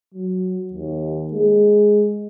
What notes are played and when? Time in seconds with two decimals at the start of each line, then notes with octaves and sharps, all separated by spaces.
0.14 F#3
0.73 D#2
1.33 G#3